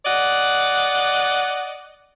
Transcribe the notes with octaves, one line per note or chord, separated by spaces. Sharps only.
D5 D#5 F#5